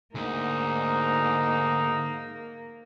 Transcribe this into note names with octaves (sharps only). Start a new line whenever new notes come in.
D2 G#2 D3 A#3 D#4